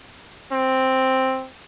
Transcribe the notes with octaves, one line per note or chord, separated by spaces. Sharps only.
C4